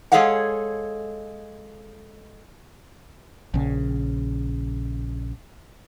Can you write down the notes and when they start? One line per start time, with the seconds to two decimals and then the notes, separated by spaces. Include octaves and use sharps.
0.12 G#3 G#4 A4 C#5 F5 F#5
3.54 A#1 C#3